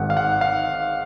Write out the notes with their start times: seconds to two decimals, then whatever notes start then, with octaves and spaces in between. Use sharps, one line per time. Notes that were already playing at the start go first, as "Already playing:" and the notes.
Already playing: G#1 G#2 D#3 F#5
0.10 F5
0.17 F#5
0.41 F5